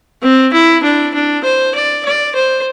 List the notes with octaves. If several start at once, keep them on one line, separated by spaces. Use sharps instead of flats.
C4
E4
D4
D4
C5
D5
D5
C5